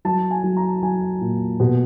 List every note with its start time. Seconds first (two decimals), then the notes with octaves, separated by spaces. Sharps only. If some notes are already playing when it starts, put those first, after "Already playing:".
0.05 F#3 A5
0.31 G#5
0.44 F#3
0.57 A#5
0.83 F#3 G#5
1.21 A#2
1.60 B2